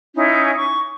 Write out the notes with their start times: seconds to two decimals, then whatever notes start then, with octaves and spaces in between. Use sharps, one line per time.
0.15 C#4 D#4 E4
0.57 C#6